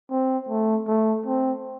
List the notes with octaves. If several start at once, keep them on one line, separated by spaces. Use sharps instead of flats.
C4
A3
A3
C4